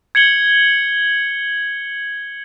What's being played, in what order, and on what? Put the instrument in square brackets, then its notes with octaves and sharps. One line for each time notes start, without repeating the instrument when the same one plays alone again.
[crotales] G#6 C#7 F#7 G7